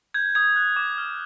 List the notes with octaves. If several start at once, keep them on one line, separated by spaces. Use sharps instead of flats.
G6 G#6
D#6 G#6
F#6
D6
F6